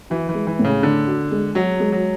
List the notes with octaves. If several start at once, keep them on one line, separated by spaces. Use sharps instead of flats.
E3 F#4
E3
G#3
E3
A2
C#3
D3 D4
F#4
G#3
F#3 F#4
G#3
F#3